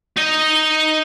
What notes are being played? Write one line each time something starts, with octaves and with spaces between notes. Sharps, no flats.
D#4 D#5